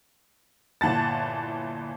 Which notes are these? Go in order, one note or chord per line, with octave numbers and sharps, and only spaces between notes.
G1 A#2 E3 F#5 A5 A6